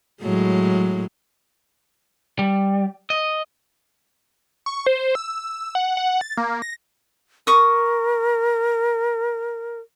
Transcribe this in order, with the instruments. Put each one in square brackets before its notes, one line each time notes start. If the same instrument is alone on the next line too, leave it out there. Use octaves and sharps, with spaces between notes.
[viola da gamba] A2 F#3 G#3
[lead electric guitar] G3
D#5
[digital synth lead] C#6
C5
E6
F#5
F#5
A6
A#3
A#6
[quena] A#4 [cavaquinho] C#6 D#6